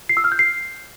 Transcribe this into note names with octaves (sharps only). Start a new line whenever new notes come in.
C7
E6
F6
G6
C7